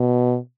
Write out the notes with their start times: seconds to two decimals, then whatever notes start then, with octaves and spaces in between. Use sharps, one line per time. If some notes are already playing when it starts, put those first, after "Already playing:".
Already playing: B2